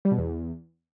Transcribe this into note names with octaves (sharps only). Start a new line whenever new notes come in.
G3
B2
E2